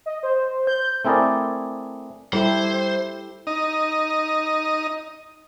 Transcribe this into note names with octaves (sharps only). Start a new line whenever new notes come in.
D#5
C5
G6
A3 C4 E4 G#4 A#4 D5
G3 E4 G4 A4 C5
D#4 D#5